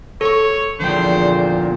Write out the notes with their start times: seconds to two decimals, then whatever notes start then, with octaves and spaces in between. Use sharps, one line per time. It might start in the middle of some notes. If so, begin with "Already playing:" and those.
0.21 A4 C#5 C#6
0.80 E2 A#2 D3 F3 C5 G5